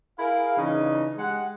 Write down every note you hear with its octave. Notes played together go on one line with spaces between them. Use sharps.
E4 G#4 A#4 F5
C#3 E3 D4 D#4
G#3 G4 F#5